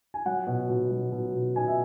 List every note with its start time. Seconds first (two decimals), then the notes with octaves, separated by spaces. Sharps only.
0.14 G#5
0.26 F#3 F#5
0.47 B2
0.69 B2
0.91 F#3
1.12 B2
1.34 B2
1.55 B2 G#5
1.68 E5